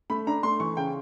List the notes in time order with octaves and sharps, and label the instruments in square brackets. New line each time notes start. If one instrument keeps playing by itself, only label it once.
[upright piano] A3 B5
D4 A#5
A3 C6
E3 C#6
C#3 G5